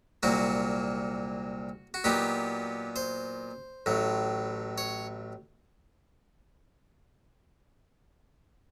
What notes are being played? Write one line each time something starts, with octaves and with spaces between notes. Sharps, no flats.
C2 A#2 F#3 A#3 F#4
F#4
A#2 F#3 B3 D#4 G4
C5
A1 A2 F#3
C#5